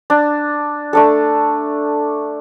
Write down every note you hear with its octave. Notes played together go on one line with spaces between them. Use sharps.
D4
A3 D4 A4